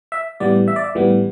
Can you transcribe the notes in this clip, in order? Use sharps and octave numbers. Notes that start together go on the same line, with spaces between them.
E5
A2 E3 G3 B3 D5
E5
D5
E5
A2 E3 G3 B3